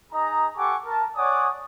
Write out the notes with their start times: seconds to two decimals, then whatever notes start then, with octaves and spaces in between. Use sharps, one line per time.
0.13 D#4 G#4 D#5 A#5
0.57 G4 A4 F#5 G#5 C#6 D6
0.86 A#4 A5
1.17 C#5 D5 F#5 G#5 D6 D#6